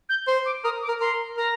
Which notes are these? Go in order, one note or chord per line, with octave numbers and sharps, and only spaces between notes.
G6
C5 C6
D6
A#4 D#6
D6
A#4
A#4 C6
A#4 A#5